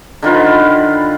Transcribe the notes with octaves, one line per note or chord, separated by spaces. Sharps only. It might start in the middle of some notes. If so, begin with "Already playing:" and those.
D3 D#3 F4 B4